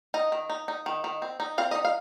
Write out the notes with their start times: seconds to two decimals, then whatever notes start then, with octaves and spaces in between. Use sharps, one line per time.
0.14 D#4 D#5
0.32 D#3
0.50 D#4
0.68 D#4
0.86 D#3
1.04 D#3
1.22 C4
1.40 D#4
1.58 C4 F5
1.71 D#4 D#5
1.85 F5